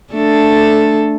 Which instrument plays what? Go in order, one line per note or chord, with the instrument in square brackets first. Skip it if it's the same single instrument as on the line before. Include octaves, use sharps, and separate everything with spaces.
[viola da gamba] A3 D4 A4